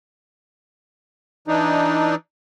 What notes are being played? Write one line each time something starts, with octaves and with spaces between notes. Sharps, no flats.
E3 D4 D#4